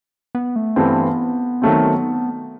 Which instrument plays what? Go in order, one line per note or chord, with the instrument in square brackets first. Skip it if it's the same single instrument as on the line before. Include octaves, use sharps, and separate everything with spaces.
[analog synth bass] B3
A3
[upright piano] G2 E3 A3 C4 [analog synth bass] B3
[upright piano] D#3 F#3 A3 C4